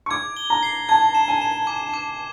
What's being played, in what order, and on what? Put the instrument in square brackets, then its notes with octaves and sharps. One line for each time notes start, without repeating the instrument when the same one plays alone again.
[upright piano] C#6
[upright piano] D6 [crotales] G#6
[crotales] G7
[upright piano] A#5
[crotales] C7
[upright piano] A5 [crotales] G#6
[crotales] E7
[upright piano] G#5
[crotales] E7
D6
D6